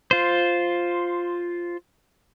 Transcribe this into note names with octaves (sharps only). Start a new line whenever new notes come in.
F4 C5